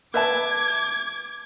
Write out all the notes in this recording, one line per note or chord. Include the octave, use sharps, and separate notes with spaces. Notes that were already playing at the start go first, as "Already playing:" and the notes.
B4 E5 A5 D6 G#6